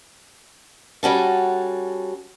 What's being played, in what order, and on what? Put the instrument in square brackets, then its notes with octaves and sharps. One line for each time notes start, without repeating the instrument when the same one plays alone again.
[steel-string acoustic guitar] G3 C#4 F#4 A4